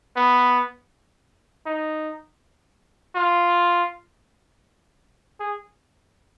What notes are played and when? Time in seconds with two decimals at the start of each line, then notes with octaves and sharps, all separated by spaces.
0.16 B3
1.66 D#4
3.16 F4
5.40 G#4